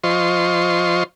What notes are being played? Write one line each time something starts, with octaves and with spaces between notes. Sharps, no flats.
F3 F4 C5 D#5 C6 C#6